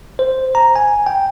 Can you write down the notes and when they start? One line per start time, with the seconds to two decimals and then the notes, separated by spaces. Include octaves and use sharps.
0.19 C5
0.55 A#5
0.76 G#5
1.06 G5